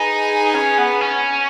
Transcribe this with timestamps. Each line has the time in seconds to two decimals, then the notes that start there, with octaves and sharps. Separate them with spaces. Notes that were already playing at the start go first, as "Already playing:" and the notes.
Already playing: D#4 G#4 B4 G#5
0.55 C#4
0.78 B3
1.01 C#4